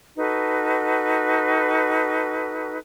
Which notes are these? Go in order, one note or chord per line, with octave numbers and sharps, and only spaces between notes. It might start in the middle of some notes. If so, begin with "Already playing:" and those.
D#4 F#4 A4 B4